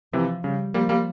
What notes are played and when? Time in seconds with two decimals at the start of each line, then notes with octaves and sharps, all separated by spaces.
0.13 C3 E3 F3
0.44 C#3 G3
0.74 F3 G3 A#3
0.89 G3 A#3